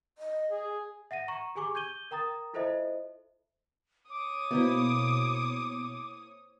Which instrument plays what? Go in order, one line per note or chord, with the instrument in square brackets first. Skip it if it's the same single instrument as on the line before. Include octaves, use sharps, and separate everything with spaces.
[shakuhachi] D#5
[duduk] G#4
[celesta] E5 F#5 A#6 D#7
A#5 C#6
G4 G#4 G#5 C#6 D6
G6 G#6 D#7 G7
A#4 G5 A#5 D#6 A6
E4 F4 A4 C5 D#5 E5
[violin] C#5 D#6 [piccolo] D6
[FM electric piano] B2 [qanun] A#3 C4 E4